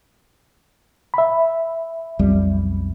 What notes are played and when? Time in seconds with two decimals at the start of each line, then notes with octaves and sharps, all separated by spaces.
1.14 E5 B5
2.19 B1 F2 G3